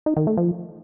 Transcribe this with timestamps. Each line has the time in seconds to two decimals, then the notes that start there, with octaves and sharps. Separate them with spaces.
0.06 D#4
0.17 D#3
0.27 A3
0.37 F3